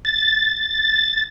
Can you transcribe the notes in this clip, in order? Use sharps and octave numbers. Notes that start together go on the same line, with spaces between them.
A6